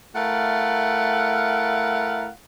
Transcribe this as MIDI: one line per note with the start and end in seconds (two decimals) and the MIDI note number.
0.14 2.28 57
0.14 2.28 64
0.14 2.28 70
0.14 2.28 77
0.14 2.28 78